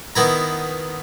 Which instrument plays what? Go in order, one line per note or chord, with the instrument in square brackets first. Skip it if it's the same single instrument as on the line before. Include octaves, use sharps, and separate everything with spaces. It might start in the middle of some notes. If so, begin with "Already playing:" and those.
[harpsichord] D#3 B3 E4 A#5